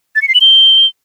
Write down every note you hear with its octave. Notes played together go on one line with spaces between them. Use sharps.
A6
C#7
C7
F#7
G7